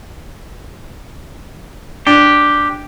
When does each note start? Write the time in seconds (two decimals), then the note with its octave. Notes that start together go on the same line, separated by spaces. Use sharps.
2.07 D4 G4